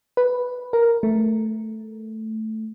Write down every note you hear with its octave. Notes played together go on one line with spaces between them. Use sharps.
B4
A#4
A3